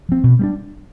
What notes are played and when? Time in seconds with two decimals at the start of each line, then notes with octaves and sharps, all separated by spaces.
0.09 F3 C4
0.24 B2
0.39 G3 B3 D4